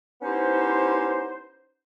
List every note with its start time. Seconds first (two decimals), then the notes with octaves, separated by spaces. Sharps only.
0.22 B3 C#4 D#4 E4 G4 C5